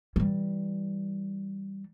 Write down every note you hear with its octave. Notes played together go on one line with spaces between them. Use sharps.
E3 G3